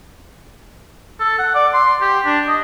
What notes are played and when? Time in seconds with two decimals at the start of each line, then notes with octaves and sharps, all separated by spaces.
1.20 A4
1.39 F#5
1.55 D5
1.74 C6
2.01 G4
2.25 D4
2.48 D#5